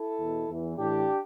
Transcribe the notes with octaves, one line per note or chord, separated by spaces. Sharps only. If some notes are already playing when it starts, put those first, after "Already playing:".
Already playing: E4 A4
E2 B2
E2 E3
A2 E3 D4 G4